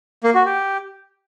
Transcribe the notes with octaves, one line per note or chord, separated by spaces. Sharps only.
A#3
F#4
G4